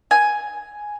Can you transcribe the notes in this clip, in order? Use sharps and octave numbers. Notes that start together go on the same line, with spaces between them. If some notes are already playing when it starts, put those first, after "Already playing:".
G#5